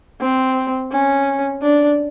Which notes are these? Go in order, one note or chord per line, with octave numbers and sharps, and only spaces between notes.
C4
C#4
D4